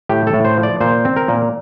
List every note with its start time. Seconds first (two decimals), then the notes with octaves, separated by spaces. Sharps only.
0.09 A2 G4
0.27 A4
0.34 A2
0.45 C5
0.58 F3
0.63 D5
0.80 A#2 C5
1.05 C4
1.16 A#4
1.28 A#2